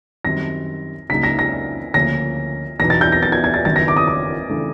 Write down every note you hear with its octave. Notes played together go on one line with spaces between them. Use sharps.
F#2 D#3 G3 C4 A#6
C#2 C#3 F#3 A#3 D#4 B6
A#6
A#6
D2 C#3 F3 A#3 C#4 A#6
E2 B2 F#3 B3 D#4 A#6
A6
G6
A#6
A6
G#6
G#6
A6
F#1 F#2 D#3 F#3 B3 A6
A#6
D6
D#6
D6
C#3 E3 A3 D4